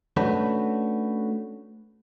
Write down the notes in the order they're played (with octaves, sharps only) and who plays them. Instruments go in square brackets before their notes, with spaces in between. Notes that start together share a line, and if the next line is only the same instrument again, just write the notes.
[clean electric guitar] A3 C#4 D4 F#4 B4